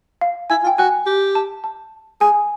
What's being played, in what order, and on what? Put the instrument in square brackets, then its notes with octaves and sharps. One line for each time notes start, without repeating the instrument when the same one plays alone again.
[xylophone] F5
[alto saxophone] E4 [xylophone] G#5
[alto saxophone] F4
[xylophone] G5
[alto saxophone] F#4 [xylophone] G#5
[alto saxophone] G4
[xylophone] A5
A5
[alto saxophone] G#4 [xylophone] G#5